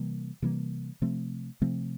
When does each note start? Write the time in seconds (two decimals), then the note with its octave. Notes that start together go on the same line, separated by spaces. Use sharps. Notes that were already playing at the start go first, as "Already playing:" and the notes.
Already playing: C3 E3 G3 A#3
0.42 C3 E3 G3 A#3
1.02 C3 F3 A3 C4
1.61 C3 F3 A3 C4